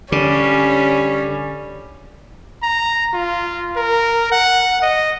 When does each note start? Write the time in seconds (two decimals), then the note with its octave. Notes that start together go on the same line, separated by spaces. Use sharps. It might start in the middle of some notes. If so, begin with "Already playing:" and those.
0.12 D3 G3 C#4
2.62 A#5
3.13 F4
3.76 A#4
4.32 F#5
4.82 D#5